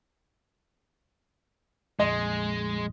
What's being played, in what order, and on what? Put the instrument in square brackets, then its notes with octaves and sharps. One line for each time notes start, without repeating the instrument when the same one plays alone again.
[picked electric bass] A#1 F2 [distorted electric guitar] G#3 [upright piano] D#5 C6